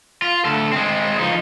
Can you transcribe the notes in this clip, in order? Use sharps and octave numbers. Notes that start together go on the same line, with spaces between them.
F4
D2 A4
G#3 C4
F3 D#4